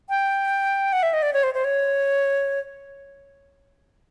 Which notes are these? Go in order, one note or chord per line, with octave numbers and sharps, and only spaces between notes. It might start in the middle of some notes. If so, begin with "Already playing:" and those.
G5
F#5
E5
D#5
D5
C#5
C5
C5
C#5